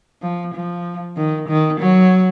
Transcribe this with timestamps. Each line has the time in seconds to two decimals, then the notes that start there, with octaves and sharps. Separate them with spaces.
0.22 F3
0.54 F3
1.17 D#3
1.48 D#3
1.80 F#3